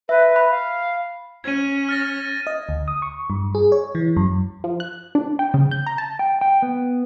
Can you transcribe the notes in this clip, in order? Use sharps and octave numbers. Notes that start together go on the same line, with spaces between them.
B4 E5
B5
F5
C#4 G#6 D#7
F6 A6 A#6
D#5
D2
D#6
C#6
G2
G#4
C#5
E3
F#2
F3
F#6
D4
G5
C#3
G6
A#5
A5
G5
G5
B3